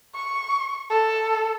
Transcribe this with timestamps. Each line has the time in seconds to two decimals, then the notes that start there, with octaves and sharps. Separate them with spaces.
0.15 C#6
0.90 A4